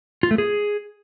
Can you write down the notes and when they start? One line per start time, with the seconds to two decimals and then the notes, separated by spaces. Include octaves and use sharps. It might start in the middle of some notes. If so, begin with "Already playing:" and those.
0.23 F4
0.31 A3
0.38 G#4